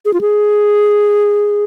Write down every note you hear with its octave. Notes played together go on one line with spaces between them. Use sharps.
G#4
F4
G#4